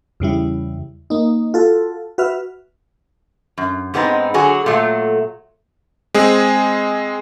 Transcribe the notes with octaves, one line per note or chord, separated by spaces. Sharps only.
E2 C#3 G3 E4
A#3 D#4
F4 F#4 A4
F#4 B4 E5 F6
F#2
G#2 G#3 B3 C4 D#4
D3 F#3 F#4 G#4
A#2 F#3 A3
G#3 C4 G#4